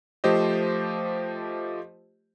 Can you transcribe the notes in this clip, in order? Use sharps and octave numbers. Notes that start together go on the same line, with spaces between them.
F3 A3 G4 C5 D#5